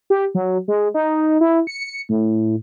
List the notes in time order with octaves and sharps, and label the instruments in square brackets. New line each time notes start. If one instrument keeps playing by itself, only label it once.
[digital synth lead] G4
F#3
G#3
D#4
E4
C#7
A2